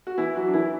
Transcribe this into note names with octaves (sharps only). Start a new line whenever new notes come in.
F#4
E3 E4
F#3 F#4
D4
E3 E4